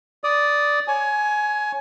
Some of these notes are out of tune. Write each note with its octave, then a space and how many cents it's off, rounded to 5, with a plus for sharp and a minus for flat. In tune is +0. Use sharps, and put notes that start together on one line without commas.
D5 -5 D#6 +0
C#5 +0 G#5 +20